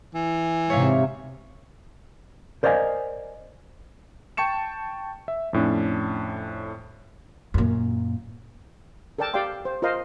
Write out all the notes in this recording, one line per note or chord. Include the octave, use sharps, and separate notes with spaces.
E3
G#2 C3 C#5 E5 F5
A#4 C5 D5 D#5 F5 G#5
G5 A5 C#6 C#7 E7
E5
F2 A2 C#4 D4
F#2 A#2
A4 A#4 D5 G5 A5
G4 D5 F5 G5 C6
C5
F4 A#4 C5 D#5 F5 C6